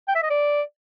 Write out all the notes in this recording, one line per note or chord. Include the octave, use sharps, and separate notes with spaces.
G5
E5
D#5
D5